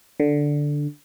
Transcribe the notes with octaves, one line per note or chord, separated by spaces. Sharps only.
D3